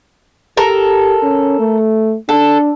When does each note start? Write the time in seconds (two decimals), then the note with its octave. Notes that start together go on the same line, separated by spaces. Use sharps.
0.57 G4 A4 A#4
1.23 C#4
1.60 A3
2.29 D4 A4